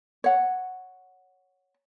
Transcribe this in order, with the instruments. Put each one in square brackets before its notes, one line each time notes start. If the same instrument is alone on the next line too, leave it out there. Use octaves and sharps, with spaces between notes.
[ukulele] C#5 F#5